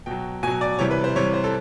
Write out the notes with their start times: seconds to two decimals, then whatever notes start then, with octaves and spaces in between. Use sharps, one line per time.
0.06 B2 F#3 G5
0.43 B2 G#5
0.47 F#3
0.61 D5
0.79 C3 E3 G3 C#5
0.91 B4
1.04 C5
1.16 C3 E3 G3 C#5
1.34 C5
1.44 A4